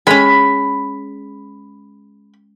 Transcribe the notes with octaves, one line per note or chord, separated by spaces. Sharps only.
G#3 C#4 B5